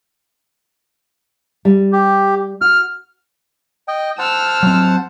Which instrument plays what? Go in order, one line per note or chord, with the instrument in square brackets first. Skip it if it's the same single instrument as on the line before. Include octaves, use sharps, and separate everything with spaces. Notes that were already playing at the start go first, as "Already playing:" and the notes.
[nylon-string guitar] G3
[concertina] G4
[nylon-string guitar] F#4 [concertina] F6
[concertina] D#5 G5
[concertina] C5 F#5 A5 [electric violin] E6 F6
[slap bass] F#3 C4